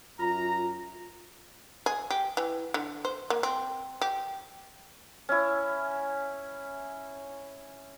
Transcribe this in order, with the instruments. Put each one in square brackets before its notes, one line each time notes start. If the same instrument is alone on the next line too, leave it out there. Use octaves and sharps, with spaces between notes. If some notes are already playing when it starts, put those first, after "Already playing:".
[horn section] F#2 A#5 [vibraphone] F4
[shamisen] G#4
G4
E3
D3
C5
A#3
C4
G4
[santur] C#4 E4